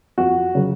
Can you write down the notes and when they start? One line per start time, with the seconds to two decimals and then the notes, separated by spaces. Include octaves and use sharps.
0.18 F2 F#4
0.55 C#3 F#3